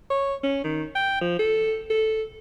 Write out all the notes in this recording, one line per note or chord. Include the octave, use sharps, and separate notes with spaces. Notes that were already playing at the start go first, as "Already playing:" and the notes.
C#5
C#4
D#3
G5
F3
A4
A4